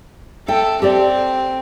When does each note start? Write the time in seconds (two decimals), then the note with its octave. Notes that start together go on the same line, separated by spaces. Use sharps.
0.48 A4 E5 G5
0.82 C4 G4 A4 D5